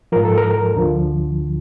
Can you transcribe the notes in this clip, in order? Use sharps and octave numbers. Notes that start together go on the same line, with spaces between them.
G#2 F3 A#4
A4
A#4
D2 D3 F3